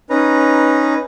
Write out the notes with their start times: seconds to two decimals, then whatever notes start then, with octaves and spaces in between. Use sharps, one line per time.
0.10 C#4 D#4 B4 A#5